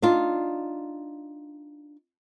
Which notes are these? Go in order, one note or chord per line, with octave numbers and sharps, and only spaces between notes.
D4 D#4 F4